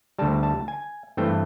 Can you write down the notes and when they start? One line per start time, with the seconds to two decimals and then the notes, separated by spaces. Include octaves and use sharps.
0.19 D2 D3 G3 A5
0.43 A5
0.68 G#5
1.17 G2 E3 A3 C4 G5